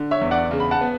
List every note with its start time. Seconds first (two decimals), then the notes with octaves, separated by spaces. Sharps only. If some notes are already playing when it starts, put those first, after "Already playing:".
Already playing: D3
0.11 C#5 E5
0.21 E2
0.31 D5 F#5
0.51 C#3
0.60 B5
0.71 F#5 A5
0.81 B3